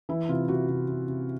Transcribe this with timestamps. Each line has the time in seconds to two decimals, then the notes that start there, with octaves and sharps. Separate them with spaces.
0.09 E3 E4
0.29 C3 F4
0.48 C3 F#4
0.68 C3
0.88 C3
1.08 C3